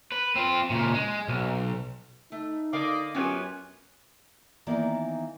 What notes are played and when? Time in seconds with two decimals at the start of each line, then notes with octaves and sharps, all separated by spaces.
0.12 B4
0.36 C4 F4
0.70 A#2 C#3
0.94 G#3
1.28 B1
2.32 A3 D#4
2.73 D3 A#4 D5 D#5 F5
3.15 F#2 B3 C#4 F4 G4 G#5
4.67 D#3 E3 A#3 B3 D#4 D5